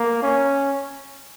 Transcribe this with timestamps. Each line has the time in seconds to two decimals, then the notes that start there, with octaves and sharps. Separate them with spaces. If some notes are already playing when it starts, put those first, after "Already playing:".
Already playing: A#3
0.22 C#4